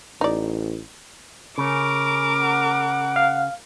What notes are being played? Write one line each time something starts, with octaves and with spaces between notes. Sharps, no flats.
A1 D#4 D5
C#3 C#4 A#4 D6
F#5
F5